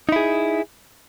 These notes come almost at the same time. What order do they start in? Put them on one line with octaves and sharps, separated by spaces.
D#4 E4 G#4